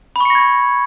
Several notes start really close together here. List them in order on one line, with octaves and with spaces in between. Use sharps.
B5 C#6 C#7 A#6 G#6